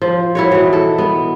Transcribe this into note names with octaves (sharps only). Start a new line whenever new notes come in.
F3
E4 F#4 C#5
B2 E3
A4
B3